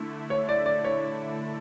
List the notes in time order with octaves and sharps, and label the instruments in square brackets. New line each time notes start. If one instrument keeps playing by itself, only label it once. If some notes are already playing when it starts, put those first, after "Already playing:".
Already playing: [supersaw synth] D3 A3 E4
[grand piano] C#5
D5
D5
C#5